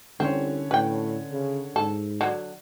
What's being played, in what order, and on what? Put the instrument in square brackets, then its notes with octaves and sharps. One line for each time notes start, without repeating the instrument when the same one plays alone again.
[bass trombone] C2 [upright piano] D3 C#4 C#5 [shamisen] C4
[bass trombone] A2 [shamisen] B4 G5
[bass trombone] C#3
[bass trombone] G#2 [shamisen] A4
[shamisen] D3 F#3